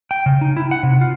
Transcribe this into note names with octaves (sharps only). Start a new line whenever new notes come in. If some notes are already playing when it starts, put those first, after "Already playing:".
G5
C#3
D#4
E4
F#5
C3
F4